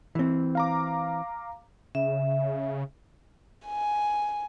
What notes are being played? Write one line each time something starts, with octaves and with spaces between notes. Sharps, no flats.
E3 C4
F5 A#5 D6
C#3 E5
G#5